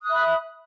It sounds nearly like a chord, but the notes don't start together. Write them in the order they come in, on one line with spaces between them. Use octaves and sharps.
D#6 F#6 E5 B5